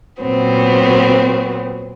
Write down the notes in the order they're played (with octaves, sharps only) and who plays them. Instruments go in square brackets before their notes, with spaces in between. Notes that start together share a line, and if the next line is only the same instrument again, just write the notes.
[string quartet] A#2 F#3 B3 C4